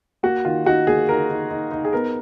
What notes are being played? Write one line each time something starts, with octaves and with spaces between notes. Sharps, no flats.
A#3 F#4
D#3 F4
D#4 F#4
A#3 G#4
D#4 A#4
D#4
D#4
D#4
G#4
B3 A#4